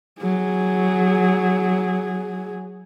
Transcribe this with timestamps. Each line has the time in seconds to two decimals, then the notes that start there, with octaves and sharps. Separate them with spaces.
0.22 F#3 G#4